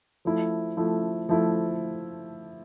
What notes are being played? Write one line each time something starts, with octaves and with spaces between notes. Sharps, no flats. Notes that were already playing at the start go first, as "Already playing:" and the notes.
F3 A3 E4
F3 A3 E4
F3 A3 E4